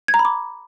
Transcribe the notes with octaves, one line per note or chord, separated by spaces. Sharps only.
G#6
A#5
B5
D6